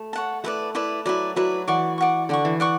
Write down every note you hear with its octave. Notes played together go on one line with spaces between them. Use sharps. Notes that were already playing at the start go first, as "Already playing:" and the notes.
Already playing: A3
C#5 F#5 A5
A3 E4 B4 D5
E4 B4 D5
F#3 E4 B4 D5
F#3 E4 B4 D5
E3 D5 F#5 C#6
D5 F#5 C#6
D3 D5 F#5 C#6
E3
D5 F#5 C#6